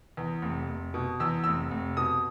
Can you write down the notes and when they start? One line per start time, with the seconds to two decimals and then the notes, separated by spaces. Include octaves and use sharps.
0.17 E2
0.42 F1
0.69 F1
0.94 B2
1.20 E2 E6
1.44 F1 E6
1.71 F1
1.97 B2 D#6